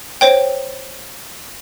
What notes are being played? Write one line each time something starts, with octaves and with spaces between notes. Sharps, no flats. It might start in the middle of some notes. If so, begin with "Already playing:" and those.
C5 C#5 G5